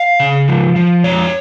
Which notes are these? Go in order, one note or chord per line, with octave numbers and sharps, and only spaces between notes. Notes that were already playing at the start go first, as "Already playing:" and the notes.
Already playing: F5
C#3
F3
F3
F2 C#5